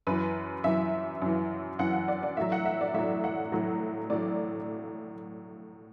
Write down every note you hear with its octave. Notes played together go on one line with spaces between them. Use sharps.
F#2 E3 B4
F#2 E3 E5
F#2 E3
F#2 E3 F#5
F#5
D5
D5
A2 F#3 E5
F#5
E5
D5
A2 F#3 E5
F#5
A2 F#3
A2 F#3 D5